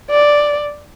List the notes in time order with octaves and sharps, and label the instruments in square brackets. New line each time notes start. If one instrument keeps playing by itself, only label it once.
[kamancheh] D5